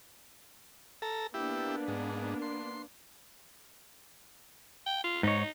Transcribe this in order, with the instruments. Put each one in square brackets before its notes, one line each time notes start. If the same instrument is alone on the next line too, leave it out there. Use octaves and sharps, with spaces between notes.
[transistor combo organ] A4 A#5
[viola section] A#3 B3 D4 [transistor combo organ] E4 G4
[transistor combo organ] G#2
C6
[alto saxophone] G5
F4
[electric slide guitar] G#2 C#5 [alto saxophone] D#4